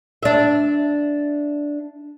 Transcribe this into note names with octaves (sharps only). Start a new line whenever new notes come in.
D4 E5